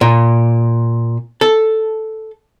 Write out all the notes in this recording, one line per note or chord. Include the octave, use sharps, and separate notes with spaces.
A#2
A4